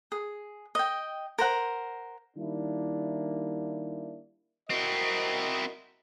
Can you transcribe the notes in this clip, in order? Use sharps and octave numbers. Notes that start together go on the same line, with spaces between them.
G#4
D#5 G5
A#4 C5 F#5
D#3 G3 A#3 D4 E4
C4 E4 F#4 A#4 D#5